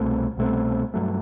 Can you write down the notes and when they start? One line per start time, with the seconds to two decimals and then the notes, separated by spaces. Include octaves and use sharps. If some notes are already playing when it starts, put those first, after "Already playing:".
Already playing: C2 B2 A3 C4
0.37 C2 B2 A3 C4
0.94 G2 F#3 A3